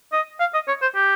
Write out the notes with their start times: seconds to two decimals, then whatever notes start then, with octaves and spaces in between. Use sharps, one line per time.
0.12 D#5
0.40 F5
0.54 D#5
0.68 C#5
0.82 C5
0.95 G4